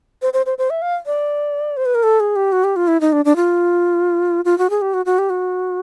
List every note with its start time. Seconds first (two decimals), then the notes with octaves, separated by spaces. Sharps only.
0.22 C5
0.33 C5
0.46 C5
0.58 C5
0.70 E5
0.82 F5
1.06 D5
1.77 C5
1.85 B4
1.95 A#4
2.03 A4
2.20 G#4
2.36 G4
2.52 F#4
2.64 G4
2.76 F4
2.88 E4
3.01 D#4
3.13 D4
3.25 D4
3.36 F4
4.45 F4
4.58 F#4
4.70 G#4
4.82 G4
4.94 F#4
5.06 F#4
5.19 G4
5.30 F#4